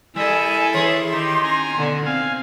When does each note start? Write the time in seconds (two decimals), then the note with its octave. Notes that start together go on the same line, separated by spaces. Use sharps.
0.16 G3 E4 A4 A#4 D#5 E5 G#5
0.74 E3 G#4 C#5 C6
1.13 D#3 D#4 G4
1.43 C#4 G#5 A#5
1.74 B2 D3
2.05 C4 F5 G#5